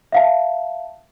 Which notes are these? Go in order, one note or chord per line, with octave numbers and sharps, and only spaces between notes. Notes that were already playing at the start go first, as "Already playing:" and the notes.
E5 F5 A5